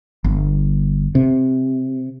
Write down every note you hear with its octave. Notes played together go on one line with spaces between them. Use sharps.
G1
C3